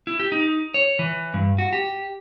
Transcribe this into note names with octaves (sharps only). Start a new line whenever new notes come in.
E4
G4
D#4
C#5
E3
G2
F#4
G4